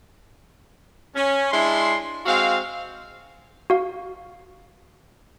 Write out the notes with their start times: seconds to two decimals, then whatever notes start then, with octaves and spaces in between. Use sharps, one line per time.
1.15 C#4
1.52 G#3 D4 E4 C6
2.26 G#3 C4 F#4 F5
3.70 F#4 F5